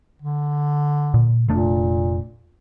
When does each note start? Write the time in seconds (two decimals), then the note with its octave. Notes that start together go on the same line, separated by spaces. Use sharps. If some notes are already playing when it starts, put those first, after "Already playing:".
0.22 D3
1.14 A#2
1.48 F1 A#2 A3 D4